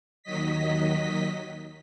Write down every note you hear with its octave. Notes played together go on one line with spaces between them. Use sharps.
D#2 D#3 F#3 D#5 B6